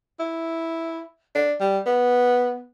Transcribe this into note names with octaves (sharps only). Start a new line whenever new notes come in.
E4
D4
G3
B3